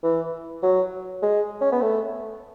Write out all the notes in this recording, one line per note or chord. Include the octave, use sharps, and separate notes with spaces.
E3
F#3
G#3
C#4
B3
A3